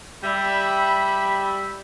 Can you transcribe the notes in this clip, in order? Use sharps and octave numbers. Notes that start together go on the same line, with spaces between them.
G3 E5 B5